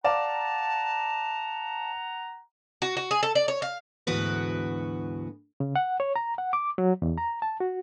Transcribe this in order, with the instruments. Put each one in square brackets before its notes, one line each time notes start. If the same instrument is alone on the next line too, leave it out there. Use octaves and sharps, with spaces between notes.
[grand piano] D5 F5 E7 [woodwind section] F#5 A#5 [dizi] A5
[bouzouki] F#4
F#4
G#4
A4
D5
C#5
F5
[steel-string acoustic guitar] D2 G#2 E3 B3 F#4 B4
[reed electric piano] C#3
F#5
C#5
A#5
F#5
D6
F#3
E2
A#5
A5
F#4